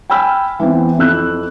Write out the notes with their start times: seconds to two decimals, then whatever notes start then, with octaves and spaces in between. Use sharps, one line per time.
0.10 G5 G#5 B5 E6 F6
0.59 E3 B3 C4 E4
0.98 F2 E4 E6 F#6